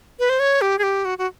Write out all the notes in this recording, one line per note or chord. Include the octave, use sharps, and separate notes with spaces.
B4
C5
C#5
G4
G#4
G4
F#4
F#4